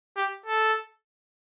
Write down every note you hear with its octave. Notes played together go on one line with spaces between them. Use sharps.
G4
A4